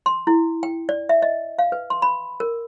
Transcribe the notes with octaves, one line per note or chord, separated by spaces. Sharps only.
C6
E4
G5
D5
E5
D#5
F5
B4
C6
B5
A#4